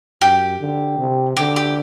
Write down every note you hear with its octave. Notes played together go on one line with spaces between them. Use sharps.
F#2 G4
D3
C3
D3 G4
G4